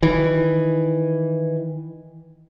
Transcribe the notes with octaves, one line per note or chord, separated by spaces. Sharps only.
D#3 E3